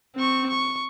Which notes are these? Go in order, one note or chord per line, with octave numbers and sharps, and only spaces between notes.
C4 C#6
C#6